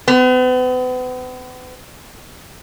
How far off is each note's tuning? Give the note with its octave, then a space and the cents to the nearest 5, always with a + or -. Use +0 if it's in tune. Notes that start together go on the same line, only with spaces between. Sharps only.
B3 +40